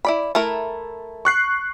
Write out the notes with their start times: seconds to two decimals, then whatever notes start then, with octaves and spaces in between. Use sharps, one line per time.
0.05 E4 D5 B5
0.35 A3 E4 A#4
1.25 C#6 F#6 C7